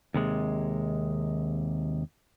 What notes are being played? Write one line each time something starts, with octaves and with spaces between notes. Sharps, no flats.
D#2 C3 G#3